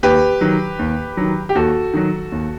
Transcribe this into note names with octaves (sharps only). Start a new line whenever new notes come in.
D#2 G4 B4
D#3 F#3
D#2
D#3 F#3
G4
D#2 F#4 A4
D#3 F#3
D#2